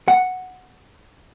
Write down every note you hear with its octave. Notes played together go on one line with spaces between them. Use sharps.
F#5